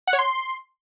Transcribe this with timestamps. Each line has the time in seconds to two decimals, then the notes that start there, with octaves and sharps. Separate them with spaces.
0.07 F#5
0.13 C#5
0.19 C6